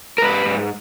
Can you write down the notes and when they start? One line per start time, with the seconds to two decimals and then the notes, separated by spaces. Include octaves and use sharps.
0.18 A#4
0.22 G#2 B4
0.46 G#2